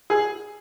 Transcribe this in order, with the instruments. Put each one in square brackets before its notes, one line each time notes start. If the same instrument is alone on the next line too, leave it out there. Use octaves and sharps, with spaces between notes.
[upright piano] G#4